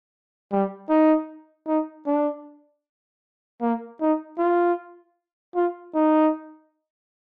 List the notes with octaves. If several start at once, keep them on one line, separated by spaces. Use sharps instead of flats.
G3
D#4
D#4
D4
A#3
D#4
F4
F4
D#4